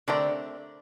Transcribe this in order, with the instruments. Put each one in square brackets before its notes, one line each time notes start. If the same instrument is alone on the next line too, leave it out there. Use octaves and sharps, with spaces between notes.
[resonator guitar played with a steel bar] D3 [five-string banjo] A3 C4 G4 A#4 D5